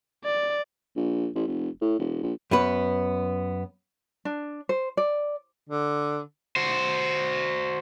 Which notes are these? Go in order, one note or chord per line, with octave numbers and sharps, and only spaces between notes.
D5
A#1
A1
F1
A2
E1
A#1
F#2 B3 B4
D4
C5
D5
D3
F#4 C5